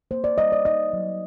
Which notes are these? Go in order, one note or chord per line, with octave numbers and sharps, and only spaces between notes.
A#3 C5
D5
G3 D#5
D5
D#4 D#5
F#3